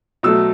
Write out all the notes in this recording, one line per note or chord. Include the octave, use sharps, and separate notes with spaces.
B2 F#3 A3 E6